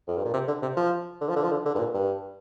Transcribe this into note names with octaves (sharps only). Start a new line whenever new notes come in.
F2
G2
A#2
C3
D3
C3
F3
D3
F3
D3
F3
D3
D3
G2
A#2
G2